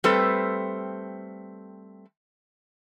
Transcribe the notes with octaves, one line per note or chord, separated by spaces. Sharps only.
G3 A3 C4 A4 B4